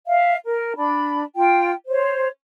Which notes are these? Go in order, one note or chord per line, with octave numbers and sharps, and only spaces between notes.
E5 F5
A#4
D4 B5
F4 G5
C5 C#5